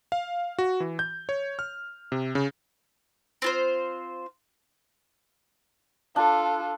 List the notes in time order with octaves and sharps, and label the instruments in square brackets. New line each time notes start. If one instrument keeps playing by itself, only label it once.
[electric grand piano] F5
F#4
E3
G6
C#5
F6
C3
C#3
[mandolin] C4 F4 C5
[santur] D4 [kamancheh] F4 A4